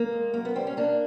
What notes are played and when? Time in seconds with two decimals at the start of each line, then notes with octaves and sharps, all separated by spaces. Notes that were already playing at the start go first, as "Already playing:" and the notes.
Already playing: A#3
0.12 G#3
0.34 F#2 A#3
0.45 B3
0.56 G3 C4
0.67 C#4
0.77 A#3 D4